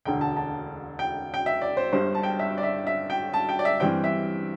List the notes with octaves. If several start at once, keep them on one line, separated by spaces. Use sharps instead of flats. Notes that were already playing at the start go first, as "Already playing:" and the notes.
E1 D2 D3 G5
A5
A5
G5
G5
E5
D5
C5
G1 G2 G3 C5
A5
G5
E5
D5
E5
E5
G5
A5
G5
D5
E5
G2 E3 G3 C4 G5
E5